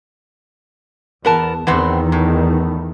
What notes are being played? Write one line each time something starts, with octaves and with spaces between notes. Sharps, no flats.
E2 B3 A#4 A5
E2 D#3 E3 B3 C4
A2